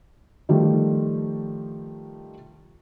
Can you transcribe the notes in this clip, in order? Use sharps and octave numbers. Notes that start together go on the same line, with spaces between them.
D#3 F3 G3 A3